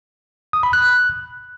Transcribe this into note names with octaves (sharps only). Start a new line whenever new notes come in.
D#6
B5
F#6